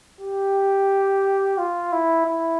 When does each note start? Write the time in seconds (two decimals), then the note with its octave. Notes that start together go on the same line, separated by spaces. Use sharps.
0.21 G4
1.58 F4
1.92 E4
2.26 E4